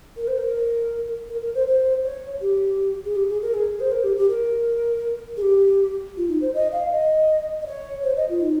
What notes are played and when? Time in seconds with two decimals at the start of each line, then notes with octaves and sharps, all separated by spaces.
0.17 A#4
0.28 C5
0.38 A#4
1.29 A#4
1.42 A#4
1.55 C5
1.67 C5
2.03 C#5
2.41 G4
3.05 G#4
3.16 G4
3.28 G#4
3.42 A#4
3.54 G#4
3.80 C5
3.92 A#4
4.04 G4
4.17 G4
4.29 A#4
5.37 G#4
5.42 G4
6.17 F4
6.28 D#4
6.41 C5
6.54 D#5
6.72 F5
6.92 D#5
7.61 D#5
7.66 C#5
8.03 C5
8.16 D#5
8.29 F4
8.40 D#4